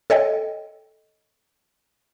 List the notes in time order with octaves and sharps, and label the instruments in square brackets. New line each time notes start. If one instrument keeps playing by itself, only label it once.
[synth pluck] A4 C#5 D#5 G5